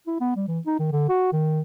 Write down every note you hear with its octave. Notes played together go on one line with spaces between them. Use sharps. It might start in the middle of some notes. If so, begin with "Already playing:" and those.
E4
B3
G3
E3
D#4
D#3
D3
F#4
D#3